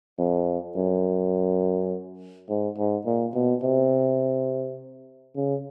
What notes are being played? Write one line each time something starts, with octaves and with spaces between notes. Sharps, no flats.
F2
F#2
G#2
G#2
A#2
B2
C3
C#3